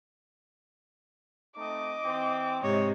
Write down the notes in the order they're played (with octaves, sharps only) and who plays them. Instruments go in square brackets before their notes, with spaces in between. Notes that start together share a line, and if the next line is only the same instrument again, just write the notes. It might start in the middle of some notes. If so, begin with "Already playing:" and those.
[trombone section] A3 C4 D#4 [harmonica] D#5 [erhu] D6
[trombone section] E3 C4
[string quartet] G#2 C3 [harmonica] C#5 [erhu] D#5